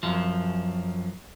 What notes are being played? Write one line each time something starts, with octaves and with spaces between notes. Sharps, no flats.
F#2 F3